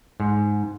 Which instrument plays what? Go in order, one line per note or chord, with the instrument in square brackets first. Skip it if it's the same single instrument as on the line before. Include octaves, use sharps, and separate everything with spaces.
[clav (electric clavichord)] G#2